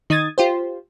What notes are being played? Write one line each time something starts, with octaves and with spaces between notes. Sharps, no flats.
D#3 D#4 D#6 G#6 A6
F4 G4 C5